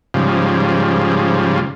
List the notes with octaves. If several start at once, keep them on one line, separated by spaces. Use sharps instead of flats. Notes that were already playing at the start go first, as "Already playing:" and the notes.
G#2 C#3 F3 G3